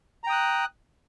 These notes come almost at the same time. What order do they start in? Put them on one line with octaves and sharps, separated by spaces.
A#5 G5 D#6 F#6